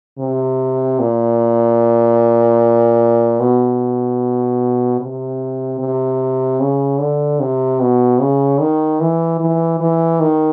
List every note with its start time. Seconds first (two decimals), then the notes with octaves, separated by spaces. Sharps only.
0.19 C3
0.99 A#2
3.40 B2
5.00 C3
5.80 C3
6.60 C#3
7.00 D3
7.40 C3
7.80 B2
8.21 C#3
8.60 D#3
9.01 E3
9.40 E3
9.81 E3
10.20 D#3